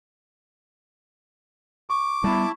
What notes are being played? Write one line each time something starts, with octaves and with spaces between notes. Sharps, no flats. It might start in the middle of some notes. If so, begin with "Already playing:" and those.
C#6 D6
G3 B3 E4 A5